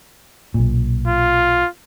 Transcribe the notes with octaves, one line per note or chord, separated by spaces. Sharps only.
B1 A#2
F4